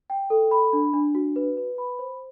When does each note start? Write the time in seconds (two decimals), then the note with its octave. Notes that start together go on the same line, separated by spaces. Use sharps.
0.10 G5
0.30 A4
0.51 B5
0.73 D4
0.93 D4
1.15 F#4
1.36 B4
1.57 B4
1.78 B5
1.99 C5